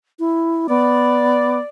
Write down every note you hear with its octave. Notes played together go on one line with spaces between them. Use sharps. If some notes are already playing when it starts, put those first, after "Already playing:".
E4
B3 D5